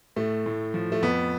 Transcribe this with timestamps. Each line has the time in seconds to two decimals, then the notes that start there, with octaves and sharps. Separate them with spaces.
0.16 A2 A3
0.46 A2
0.74 F3
0.92 A3
1.02 F2 B3